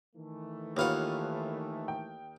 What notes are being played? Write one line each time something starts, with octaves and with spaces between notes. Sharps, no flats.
D#3 E3 A3
D#2 F4 B4 C#5 F5 F#5
G5